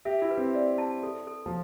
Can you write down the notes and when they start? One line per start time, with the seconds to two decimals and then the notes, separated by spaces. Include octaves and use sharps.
0.05 G4 E5
0.22 E4
0.30 B4
0.38 C4
0.55 D5
0.78 A5
1.03 A4
1.27 A4
1.46 F3